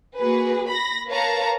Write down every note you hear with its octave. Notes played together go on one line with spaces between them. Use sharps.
A#3 F#4 G#4 B4
B5 A#6
A#4 B4 C#5 F5 A5 A#5